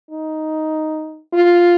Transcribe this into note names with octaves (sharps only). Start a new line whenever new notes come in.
D#4
F4